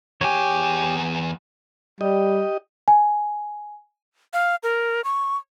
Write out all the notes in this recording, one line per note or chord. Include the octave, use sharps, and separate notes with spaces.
E2 G4 C#5 G#5
G3 G4 D#5
G#5
F5
A#4
C#6